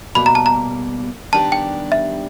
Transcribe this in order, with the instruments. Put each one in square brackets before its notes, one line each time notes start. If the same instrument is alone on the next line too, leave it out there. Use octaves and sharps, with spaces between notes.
[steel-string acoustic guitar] B2 G3 A#3 [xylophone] B5
[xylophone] A#5
A5
A#5
[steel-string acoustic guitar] D#3 G3 B3 D4 G4 [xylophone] A5
[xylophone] G5
E5